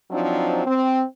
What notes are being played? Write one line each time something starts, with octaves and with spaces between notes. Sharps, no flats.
F3 F#3 C4 D4 D#4
C4